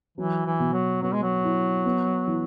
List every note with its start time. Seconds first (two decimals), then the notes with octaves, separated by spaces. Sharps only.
0.18 E3 F#3
0.46 E3
0.60 B2
0.73 F#3
1.02 F#3 B3
1.13 G#3
1.23 F#3
1.44 E4
1.85 B3
2.27 E3